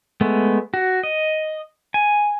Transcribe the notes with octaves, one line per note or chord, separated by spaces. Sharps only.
G#3 A3 B3
F#4
D#5
G#5